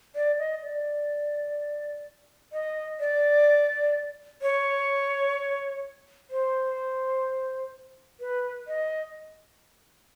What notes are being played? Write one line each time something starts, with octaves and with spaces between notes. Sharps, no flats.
D5
D#5
D5
D#5
D5
C#5
C5
B4
D#5